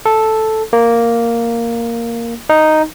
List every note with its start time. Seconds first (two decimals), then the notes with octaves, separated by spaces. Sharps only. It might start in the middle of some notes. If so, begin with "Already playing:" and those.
0.06 A4
0.73 A#3
2.49 D#4